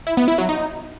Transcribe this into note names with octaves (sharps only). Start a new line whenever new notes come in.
E4
B3
E4
F#3
D#4